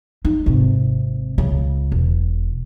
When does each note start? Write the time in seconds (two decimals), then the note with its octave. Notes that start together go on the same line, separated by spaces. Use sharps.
0.25 D#4
0.46 G#1 C3
1.38 C#2 C#3
1.92 E1